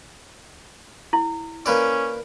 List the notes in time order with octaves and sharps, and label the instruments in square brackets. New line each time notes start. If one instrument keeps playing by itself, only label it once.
[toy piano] E4
[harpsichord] A#3 B4 D5 [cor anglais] C#4